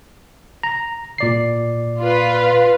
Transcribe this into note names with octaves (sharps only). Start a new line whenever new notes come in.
A#5
A#2 D5 C7
F4 B4